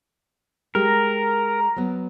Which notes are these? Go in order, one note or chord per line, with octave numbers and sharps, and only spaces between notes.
G#3 G4 A#4 A#5
F#3 B3